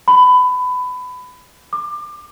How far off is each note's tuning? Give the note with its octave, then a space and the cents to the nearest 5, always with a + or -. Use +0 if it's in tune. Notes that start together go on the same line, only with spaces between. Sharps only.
B5 +20
D6 +25